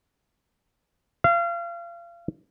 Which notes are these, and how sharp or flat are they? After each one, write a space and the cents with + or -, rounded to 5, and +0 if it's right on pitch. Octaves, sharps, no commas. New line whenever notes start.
F5 -30